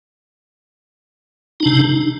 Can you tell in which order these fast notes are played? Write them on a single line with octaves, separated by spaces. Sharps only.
D#4 D4 C3